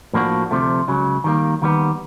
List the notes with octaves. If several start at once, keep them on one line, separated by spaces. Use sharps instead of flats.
A2 F3 A#3 D4 F#4
D2 C3 F3 A3
C#2 C#3 F#3
D#3 G3 A#3
D#2 D#3 G3 B3